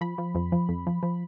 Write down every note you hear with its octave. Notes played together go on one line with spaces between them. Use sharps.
F3 B5
F3
F2
F3
F2
F3
F3